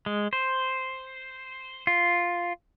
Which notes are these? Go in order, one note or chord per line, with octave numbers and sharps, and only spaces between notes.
G#3
C5
F4